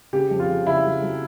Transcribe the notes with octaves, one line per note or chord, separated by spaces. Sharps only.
C#3 G4
F2
F4
C#3
C#3 E4
F#3
F#3